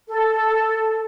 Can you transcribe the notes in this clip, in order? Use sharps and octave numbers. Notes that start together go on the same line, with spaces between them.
A4